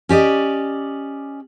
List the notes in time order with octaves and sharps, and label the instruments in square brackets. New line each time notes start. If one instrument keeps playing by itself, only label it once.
[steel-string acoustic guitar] C#4 G4 D5 D#5